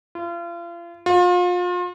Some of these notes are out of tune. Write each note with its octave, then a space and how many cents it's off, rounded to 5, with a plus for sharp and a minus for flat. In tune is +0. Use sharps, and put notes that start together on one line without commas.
F4 -35
F4 +35